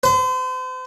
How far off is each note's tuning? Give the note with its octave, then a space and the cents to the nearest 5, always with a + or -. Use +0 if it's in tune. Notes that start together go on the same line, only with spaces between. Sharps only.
C5 -40